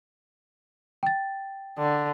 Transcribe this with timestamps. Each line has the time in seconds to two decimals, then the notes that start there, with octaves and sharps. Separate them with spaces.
1.03 G5 A6
1.78 D3